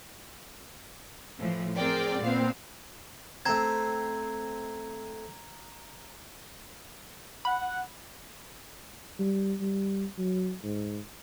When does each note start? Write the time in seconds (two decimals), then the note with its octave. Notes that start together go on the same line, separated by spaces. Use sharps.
1.38 A2 E3 F3
1.76 C4 G#4 A#4 D5 G5
2.21 A#2 B3 C4 F5
3.45 A3 C4 A#5 G#6
7.45 F#5 B5
9.19 G3
9.61 G3
10.18 F#3
10.64 G#2